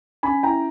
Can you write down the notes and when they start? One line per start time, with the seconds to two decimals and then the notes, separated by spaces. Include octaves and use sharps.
0.23 C#4 G#5 B5
0.43 E4 G5 A#5